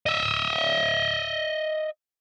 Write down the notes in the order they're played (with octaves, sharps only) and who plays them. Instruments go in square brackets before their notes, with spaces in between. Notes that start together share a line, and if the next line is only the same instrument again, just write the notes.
[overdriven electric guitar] D#5 E5